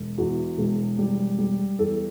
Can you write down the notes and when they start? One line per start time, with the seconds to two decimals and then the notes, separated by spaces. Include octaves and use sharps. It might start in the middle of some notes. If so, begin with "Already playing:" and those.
Already playing: E1
0.18 E2 F#4
0.58 E1
0.99 G3
1.38 G3
1.79 E2 A4